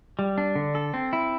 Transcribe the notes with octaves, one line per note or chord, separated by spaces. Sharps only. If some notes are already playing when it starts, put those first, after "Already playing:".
G3
D4
D3
A4
C4
E4